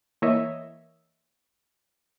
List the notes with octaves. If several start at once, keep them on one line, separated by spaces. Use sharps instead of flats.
E3 A#3 C#5 D#5 E5